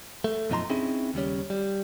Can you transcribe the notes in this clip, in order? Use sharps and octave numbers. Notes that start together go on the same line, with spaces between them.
A3
F#2 B2 F3 D#4 A#5 C6
C4 C#4 D#4 E4 G#4
D#2 C#3 G3 C#4
G3